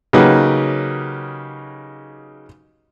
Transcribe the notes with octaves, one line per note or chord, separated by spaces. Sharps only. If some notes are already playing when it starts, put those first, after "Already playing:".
C#3 F#3 A#3 D#4 G4 B4